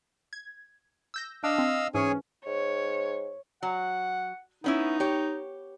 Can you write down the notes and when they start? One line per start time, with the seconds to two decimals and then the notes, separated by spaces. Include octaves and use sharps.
0.33 G#6
1.14 E6 G6 A#6
1.44 D4 D#5 F5 E6
1.58 C4
1.95 G#2 E3 C#4 G#4 C#5 G#5
2.46 G#2 C#5
3.63 F#3 F#5
4.64 B3 C#4 D#4 E4
5.00 G4 C#5